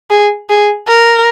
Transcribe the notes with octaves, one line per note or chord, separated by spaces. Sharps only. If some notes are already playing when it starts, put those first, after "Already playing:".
G#4
G#4
A#4